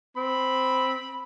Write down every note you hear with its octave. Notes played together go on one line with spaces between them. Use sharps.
C4 B5